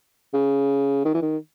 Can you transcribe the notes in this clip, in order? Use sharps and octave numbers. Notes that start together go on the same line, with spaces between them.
C#3
D#3
E3
D#3